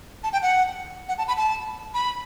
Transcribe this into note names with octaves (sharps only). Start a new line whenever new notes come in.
A5
G5
F#5
F#5
A5
B5
A5
B5